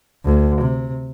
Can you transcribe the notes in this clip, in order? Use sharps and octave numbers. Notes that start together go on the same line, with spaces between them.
D2
C3